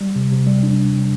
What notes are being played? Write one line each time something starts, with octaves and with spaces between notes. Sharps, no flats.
G3
C3
C3
G3
D4
G3
G3